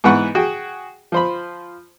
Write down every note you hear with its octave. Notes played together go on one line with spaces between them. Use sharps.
G#2 E3 B3 B4 F#5 C#6
F#4 G#4 G5
F3 C5 B5